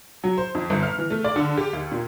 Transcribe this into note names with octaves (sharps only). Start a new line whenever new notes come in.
F#3
C5
F2
G1
F6
E3
A3
D5
D3
G4
D#2
A#2